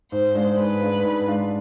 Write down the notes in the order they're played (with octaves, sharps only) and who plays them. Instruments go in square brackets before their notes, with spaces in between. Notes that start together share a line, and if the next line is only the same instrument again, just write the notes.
[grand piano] G#2 [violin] C5
[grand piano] G#3 D4 F4
[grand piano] G#2 [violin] B4
[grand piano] G#3 D4 F4
G#2
G#3 D4 F4